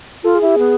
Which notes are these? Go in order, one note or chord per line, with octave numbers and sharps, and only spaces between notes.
F4 A4
G#4
E4 G4
B3 G#4